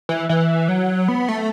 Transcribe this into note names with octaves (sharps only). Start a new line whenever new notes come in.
E3
E3
F#3
B3
A3